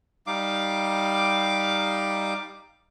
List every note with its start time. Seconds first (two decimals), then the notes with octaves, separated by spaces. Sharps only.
0.27 G3 D#4 F5 D6